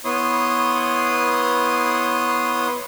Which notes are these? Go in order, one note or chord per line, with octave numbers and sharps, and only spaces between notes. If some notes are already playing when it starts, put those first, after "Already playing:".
B3 E4 C#5 C6 D#6